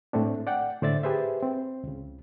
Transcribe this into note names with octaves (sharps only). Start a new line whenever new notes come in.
A2 A3 C4 D4
D5 F#5 G5
A2 D3 C5 D5 E5 A6
G4 G#4 B4 C5 E5
C4
C#2 C#3